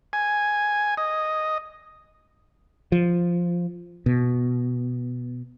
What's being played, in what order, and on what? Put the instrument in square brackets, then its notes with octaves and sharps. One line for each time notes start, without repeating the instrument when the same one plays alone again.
[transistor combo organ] G#5
D#5
[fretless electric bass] F3
B2